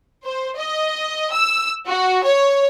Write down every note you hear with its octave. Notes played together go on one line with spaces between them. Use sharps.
C5
D#5
E6
F#4
C#5